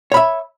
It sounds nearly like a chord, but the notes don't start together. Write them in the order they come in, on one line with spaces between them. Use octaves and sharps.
C#5 B5 E5